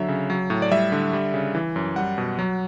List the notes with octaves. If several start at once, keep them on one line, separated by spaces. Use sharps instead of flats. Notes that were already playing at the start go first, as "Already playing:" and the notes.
Already playing: D3 F#3 E5
C#3
F#3
A2
D5
G3 E5
D3
G3
C#3
E3
F#2
G3 F#5
B2
F#3